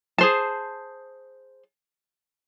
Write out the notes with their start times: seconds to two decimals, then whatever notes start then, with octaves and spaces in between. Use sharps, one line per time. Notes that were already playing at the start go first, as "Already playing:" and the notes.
0.18 G#4 C5 A5